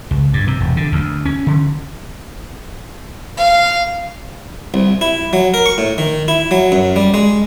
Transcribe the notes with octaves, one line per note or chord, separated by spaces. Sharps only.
C#2
G2
C3
E1
D3
D2
C#4
D3
F5
C2
E4
F#3
A#4
C#6
A2
D#3
E4
F#3
F#2
G3
G#3